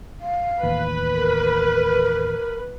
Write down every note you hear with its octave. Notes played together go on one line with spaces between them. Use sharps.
F5
A1 D#2 B4
A#4